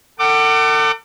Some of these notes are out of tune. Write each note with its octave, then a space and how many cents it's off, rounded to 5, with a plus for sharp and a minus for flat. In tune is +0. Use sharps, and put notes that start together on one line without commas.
A4 +40 F#5 +40 D6 +20